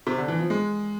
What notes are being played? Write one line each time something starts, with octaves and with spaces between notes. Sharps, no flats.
C3
D3
E3
F3
G#3